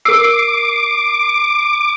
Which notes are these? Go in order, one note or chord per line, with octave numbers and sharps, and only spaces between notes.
A#4 D6 E6 C7